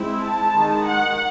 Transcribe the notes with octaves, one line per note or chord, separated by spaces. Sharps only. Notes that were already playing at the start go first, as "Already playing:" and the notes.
Already playing: G#3 C4 E4
A5
D#3 G#3 D#4
F#5